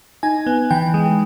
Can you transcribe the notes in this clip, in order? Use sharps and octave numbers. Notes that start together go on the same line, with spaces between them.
D#4 G#5
B3
E3 G5
G#3